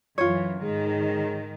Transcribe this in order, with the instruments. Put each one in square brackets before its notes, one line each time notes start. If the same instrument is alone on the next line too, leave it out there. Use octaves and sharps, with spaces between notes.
[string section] F#2 E3 [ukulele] F4 C#5
[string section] G#2 D#3 [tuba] G#3